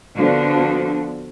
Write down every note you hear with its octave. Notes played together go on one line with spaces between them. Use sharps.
D3 F3 B3 C4 D4 F#4